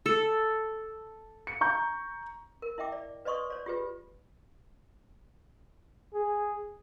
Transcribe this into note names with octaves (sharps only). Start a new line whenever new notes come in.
A4
C#7
A#5 C#6 G6
A#4
E4 D#5 E5 G5 D6
D5
B4 D5 D#5 C6 C#6 D#6
C#5 D5
F4 G4 G#4 B4
G#4